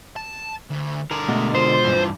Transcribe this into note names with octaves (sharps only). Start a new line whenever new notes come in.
A5
D2
D3 G#4 A#4
B2 G#3 A3
F4 C5
G2 E3